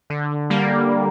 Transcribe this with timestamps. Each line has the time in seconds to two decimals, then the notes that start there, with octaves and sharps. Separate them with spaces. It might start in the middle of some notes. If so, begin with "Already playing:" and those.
0.10 D3
0.50 G3 A#3